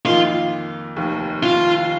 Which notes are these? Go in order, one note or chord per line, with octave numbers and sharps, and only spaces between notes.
F2 D#3 A#3 D#4 F4
F1 D#2 D#3
F4